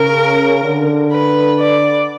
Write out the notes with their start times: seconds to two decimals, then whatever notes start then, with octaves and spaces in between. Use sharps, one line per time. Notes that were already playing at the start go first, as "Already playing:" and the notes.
Already playing: C#3 A#4
0.64 D3
1.12 B4
1.59 D5